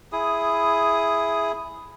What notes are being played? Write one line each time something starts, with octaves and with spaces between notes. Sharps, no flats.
E4 G#4 D#6